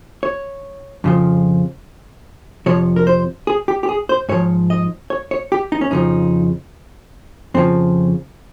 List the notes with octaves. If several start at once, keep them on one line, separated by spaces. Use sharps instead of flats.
C#5
F2 C#3 F3
F2 C3 F3 C#5
A#4
C5
G#4
G4
G4
G#4
C5
G#2 F3 C#5
D#5
C#5
C#5
G4
D#4
C#4
F2 C#3 F3 D#4
F2 C#3 F3 C4